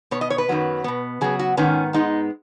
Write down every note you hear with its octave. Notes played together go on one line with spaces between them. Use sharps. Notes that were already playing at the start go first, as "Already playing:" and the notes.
B2 B3 C#5
D#5
C#5
B4
F#2 D#3 F#3 B3
B2 B3
C#3 F#3 B3 G#4
F#4
G#2 D#3 B3 C#4
G#2 G#3 B3 D#4